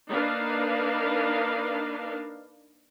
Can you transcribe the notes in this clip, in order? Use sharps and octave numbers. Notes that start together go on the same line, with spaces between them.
A#3 D4 D#4 A#4 B4 F5